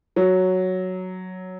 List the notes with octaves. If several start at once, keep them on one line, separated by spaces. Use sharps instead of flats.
F#3